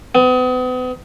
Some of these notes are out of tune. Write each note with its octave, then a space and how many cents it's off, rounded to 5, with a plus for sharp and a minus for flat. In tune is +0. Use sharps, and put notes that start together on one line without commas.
B3 +40